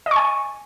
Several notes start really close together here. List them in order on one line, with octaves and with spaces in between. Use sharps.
D#5 C#6 G#5